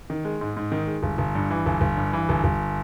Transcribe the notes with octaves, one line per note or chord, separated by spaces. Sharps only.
D#3
G#3
G#2
G#2
D#3
G#3
G1
G1
G2
E3
G1
G1
G2
E3
G1
G1